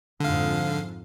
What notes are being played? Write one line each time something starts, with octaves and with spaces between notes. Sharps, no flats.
F2 G#2 D3 F3 F5